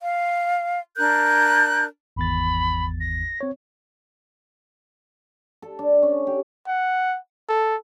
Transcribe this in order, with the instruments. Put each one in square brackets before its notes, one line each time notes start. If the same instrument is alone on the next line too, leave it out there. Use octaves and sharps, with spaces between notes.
[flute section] F5
D4 A#4 F#6 G6
[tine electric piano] G#1 E2 A6 [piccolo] B5
[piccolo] A#6
[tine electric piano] C4 C#5
[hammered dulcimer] A4
D4
C#4
G4
[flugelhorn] F#5
A4